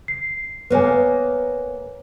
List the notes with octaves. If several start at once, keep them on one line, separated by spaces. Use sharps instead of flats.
C7
A#3 B3 B4 C#5 G#5